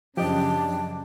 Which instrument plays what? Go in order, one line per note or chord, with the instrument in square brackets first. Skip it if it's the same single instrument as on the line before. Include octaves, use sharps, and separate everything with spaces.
[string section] F#2 C#3 [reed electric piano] F3 D#5 [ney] D4 [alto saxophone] G4